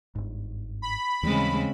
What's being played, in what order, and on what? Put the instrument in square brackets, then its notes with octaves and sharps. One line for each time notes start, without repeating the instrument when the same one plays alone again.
[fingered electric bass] G1 G#2
[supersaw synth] B5
[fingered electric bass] D#2 E3 G3 [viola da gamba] C#3 G#3 C4